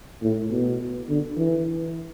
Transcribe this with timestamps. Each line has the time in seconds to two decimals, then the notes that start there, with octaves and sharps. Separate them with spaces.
0.22 A2
0.50 B2
1.08 D3
1.37 E3